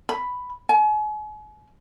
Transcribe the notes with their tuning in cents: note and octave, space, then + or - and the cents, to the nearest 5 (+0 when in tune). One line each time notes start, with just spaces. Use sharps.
B5 +5
G#5 +40